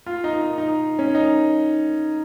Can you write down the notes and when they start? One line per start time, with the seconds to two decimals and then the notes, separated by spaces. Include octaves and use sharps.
0.06 F4
0.24 D#4
0.42 D#4
0.58 D#4
0.99 C#4
1.15 D#4